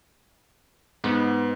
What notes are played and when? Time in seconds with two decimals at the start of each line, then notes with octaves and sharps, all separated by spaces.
1.04 G#2 B3